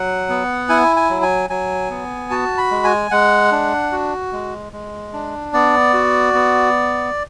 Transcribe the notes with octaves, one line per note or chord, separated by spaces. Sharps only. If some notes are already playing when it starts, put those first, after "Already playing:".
Already playing: F#3 F#5
B3
E4 G#5
G#5
F#3
G#5
F#3 G#5
B3
F#4 A5
B5
G#3
G#5
G#3 F#5
D4
F#4
G#3
G#3
D4
B3 D5
F#4
B3